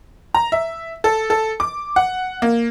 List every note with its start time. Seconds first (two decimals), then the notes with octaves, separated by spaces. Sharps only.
0.35 A#5
0.52 E5
1.04 A4
1.30 A4
1.60 D6
1.96 F#5
2.42 A#3